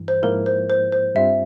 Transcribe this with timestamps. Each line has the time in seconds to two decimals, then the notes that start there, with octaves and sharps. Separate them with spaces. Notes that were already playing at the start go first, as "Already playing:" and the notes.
Already playing: G2 E3
0.08 C5
0.23 G#2 F3 A#3 E4 A#4
0.46 C5
0.70 C5
0.92 C5
1.15 G2 G3 C4 F4 E5